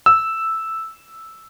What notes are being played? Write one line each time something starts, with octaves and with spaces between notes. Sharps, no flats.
E6